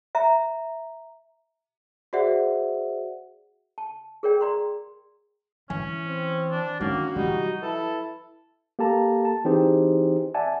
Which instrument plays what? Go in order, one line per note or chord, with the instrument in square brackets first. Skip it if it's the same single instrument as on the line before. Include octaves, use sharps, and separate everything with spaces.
[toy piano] E5 A#5
[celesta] F#4 G#4 C5 D5 E5 F#5
[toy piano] A5
G#4 A#4 C#5 D5 G5
D5 A#5 C6
[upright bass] E3 [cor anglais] C#4 [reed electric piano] G#5
[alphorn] C4
[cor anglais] D4
[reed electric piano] D#3 C#4 [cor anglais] A#3 [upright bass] D4 [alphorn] F#4
[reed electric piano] C3 E3 G3 [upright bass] F3 [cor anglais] D#4
[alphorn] E4 [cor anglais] A4 [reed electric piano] B4 A5
[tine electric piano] A#3 G4 A4 A5 A#5
A5
E3 C4 D#4 G4 G#4 C5
D5 E5 F#5 G#5 A5